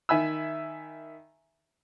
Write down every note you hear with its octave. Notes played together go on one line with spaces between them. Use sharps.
D#3 E5 G#5 B5 E6